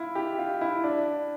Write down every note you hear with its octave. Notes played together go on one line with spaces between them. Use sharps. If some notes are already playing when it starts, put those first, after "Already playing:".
Already playing: E4 F4
G4
F4
E4
D4